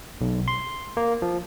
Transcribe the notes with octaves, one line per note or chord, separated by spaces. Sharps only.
B1
C6
A#3
F3